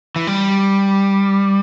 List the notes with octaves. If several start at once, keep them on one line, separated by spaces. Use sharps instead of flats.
E3
G3